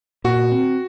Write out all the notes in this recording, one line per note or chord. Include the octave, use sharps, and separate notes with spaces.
A#2 F#4
C4